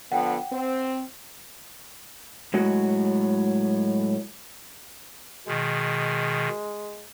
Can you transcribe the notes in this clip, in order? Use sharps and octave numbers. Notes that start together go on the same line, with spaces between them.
D3 F3 B3 F#5 G5
C4
A2 F#3 G#3 F#4
B2 D#3 G#3